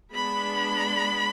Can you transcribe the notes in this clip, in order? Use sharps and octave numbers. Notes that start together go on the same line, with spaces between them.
G#3 B3 D4 B5